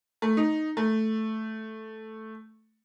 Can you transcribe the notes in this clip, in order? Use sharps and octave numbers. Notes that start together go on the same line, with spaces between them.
A3
D#4
A3